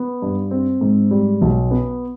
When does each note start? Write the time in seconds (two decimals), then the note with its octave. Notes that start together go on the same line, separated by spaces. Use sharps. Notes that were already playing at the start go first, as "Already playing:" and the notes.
Already playing: B3
0.22 G2
0.51 C4
0.81 G#2
1.11 G3
1.42 B1
1.71 B3